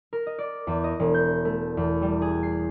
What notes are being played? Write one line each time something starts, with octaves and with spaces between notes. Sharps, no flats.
A#4
D#5
D5
E2
D#5
E1
G6
A3
E2
G3
G#4
C7